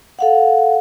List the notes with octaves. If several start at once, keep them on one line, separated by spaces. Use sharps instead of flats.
A4 F5 F#5